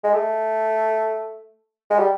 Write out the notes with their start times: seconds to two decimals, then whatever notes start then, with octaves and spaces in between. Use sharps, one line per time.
0.04 G#3
0.14 A3
1.90 G#3
1.99 G3